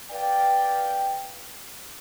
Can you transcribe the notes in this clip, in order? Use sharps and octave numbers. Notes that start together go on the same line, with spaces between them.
B4 D5 F5 G5